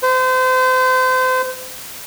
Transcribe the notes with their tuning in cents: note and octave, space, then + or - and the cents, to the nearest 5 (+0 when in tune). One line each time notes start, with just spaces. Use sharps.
C5 -35